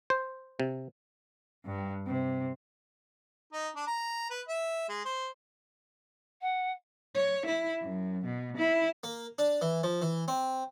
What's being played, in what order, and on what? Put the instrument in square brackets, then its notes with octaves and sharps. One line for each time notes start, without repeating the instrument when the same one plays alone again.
[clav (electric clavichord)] C5
C3
[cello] G2
C3
[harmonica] D#4
D4
A#5
B4
E5
G#3
C5
[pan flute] F#5
[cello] C#5
E4
F#2
B2
E4
[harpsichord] A#3
D4
E3
F3
E3
C4